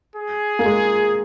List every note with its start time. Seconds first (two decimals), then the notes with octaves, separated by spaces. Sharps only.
0.16 G#4
0.59 A#3
0.65 G#3